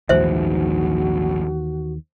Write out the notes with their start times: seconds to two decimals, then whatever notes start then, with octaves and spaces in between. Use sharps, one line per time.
0.09 A#1 D#2 G#2 E3 F#4 C5 E5